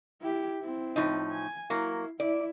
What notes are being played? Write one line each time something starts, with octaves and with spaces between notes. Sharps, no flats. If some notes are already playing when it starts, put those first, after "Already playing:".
E4 G4
C4 E4
A2 F3 D#4
G#5
F#3 A#3 E4
E4 D5